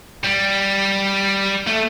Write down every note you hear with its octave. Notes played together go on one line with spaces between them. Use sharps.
G3
A3